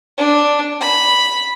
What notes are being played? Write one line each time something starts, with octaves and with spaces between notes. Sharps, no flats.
D4
B5